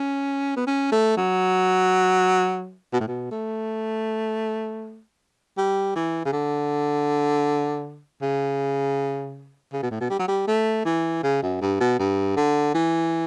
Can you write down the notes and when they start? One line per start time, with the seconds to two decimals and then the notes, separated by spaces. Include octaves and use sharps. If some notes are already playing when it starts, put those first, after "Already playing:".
Already playing: C#4
0.56 B3
0.67 C#4
0.92 A3
1.17 F#3
2.93 B2
3.00 A2
3.07 B2
3.31 A3
5.57 G3
5.95 E3
6.25 C#3
6.33 D3
8.22 C#3
9.72 C#3
9.82 B2
9.91 A2
10.00 B2
10.10 G3
10.19 F#3
10.28 G3
10.47 A3
10.85 E3
11.23 C#3
11.42 F#2
11.61 G2
11.80 B2
11.99 G2
12.37 D3
12.74 E3